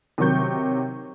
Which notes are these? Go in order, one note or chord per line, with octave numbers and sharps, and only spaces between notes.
C3 D#3 F#3 C#6 G6